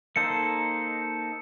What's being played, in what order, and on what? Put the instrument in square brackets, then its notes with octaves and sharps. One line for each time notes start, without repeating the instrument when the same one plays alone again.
[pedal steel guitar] A#3 D#4 A4 C5 [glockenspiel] C#7